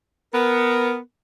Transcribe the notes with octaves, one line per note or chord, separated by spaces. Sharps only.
B3 A#4